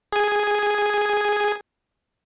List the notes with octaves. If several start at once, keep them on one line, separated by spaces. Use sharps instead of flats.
G#4 G#5